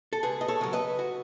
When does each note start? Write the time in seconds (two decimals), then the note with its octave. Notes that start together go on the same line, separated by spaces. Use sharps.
0.13 A4
0.23 C#2 G#4 B4
0.41 D#5
0.48 A4 C#5
0.61 C#3 F#3
0.73 B4 D#5
0.99 F#4